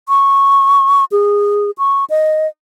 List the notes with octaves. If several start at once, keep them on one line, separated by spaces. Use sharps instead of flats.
C#6
G#4
C#6
D#5